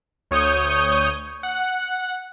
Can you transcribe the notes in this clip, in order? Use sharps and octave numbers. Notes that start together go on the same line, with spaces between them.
D2 C#5 D#6 G6
F#5